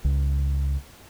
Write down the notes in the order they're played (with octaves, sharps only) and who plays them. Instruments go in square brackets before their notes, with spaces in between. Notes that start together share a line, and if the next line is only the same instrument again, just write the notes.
[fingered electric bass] C#2